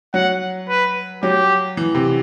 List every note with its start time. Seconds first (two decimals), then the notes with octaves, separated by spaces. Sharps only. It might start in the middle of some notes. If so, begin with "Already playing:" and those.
0.14 F#3 F#5
0.69 B4
1.23 F#3 G4
1.77 E3
1.95 C3